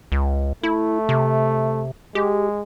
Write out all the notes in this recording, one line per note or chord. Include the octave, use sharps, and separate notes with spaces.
C#2
A3 E4
C3
G#3 G4